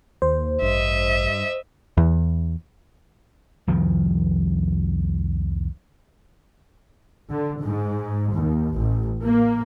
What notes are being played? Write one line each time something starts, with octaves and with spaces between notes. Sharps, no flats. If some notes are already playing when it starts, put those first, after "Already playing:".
D#2 C5
A1 G2 D#5 E5
E2
C2 F2 D#3 F3
D3
G#2
D#2
A1
A#3